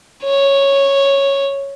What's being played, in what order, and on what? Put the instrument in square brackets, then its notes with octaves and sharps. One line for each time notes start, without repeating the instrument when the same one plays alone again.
[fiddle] C#5